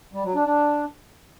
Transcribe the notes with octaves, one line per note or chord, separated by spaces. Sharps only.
G3
F#3
D4
D4